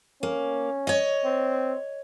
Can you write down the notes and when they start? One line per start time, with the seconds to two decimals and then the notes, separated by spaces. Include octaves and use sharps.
0.23 A#3 C#4
0.87 C#5 D#5
1.25 C4